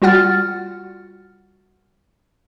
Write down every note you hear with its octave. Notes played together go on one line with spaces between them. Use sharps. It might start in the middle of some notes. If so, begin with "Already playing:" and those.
G3 F4 F#4 F#5 F6 A6